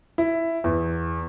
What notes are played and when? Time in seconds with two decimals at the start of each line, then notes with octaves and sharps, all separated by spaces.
0.18 E4
0.64 E2